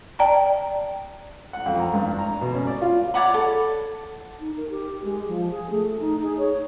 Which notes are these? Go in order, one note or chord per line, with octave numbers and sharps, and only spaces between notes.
D5 G5 A5 A#5
F#5
F2
A#5
G2
D4
A#5
B2
C#4
D5
F4
C#5 D5 F#5 B5
A4
D#4
A#4
G4
G#3
F3
G#4
A3
D#4
G#4
C#5